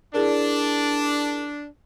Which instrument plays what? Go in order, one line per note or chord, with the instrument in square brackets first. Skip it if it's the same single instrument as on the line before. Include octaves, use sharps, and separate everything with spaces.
[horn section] D4 [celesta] E4 G#4 A#4